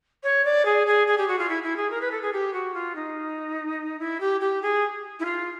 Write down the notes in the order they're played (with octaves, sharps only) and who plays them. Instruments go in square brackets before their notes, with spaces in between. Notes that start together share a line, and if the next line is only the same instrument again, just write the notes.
[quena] C#5
D5
G#4
G#4
G#4
G4
F#4
F4
E4
E4
G#4
A#4
B4
A4
G#4
G4
F#4
F4
D#4
E4
G4
G4
G#4
E4
F4